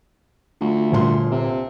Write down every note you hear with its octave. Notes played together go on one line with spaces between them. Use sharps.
D2 F4
G1 A#2 C6
C3